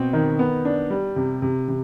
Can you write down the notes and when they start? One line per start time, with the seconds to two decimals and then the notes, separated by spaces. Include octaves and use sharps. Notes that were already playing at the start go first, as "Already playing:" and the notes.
Already playing: B2 C4
0.13 D#3
0.39 B3
0.65 D4
0.90 G3
1.16 C3
1.42 C3
1.68 C3